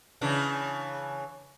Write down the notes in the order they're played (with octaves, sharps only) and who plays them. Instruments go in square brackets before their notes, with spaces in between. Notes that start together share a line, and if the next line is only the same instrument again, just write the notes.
[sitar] C#3 E3 D4